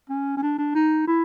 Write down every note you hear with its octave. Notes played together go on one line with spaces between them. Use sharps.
C#4
C#4
D4
D4
D#4
E4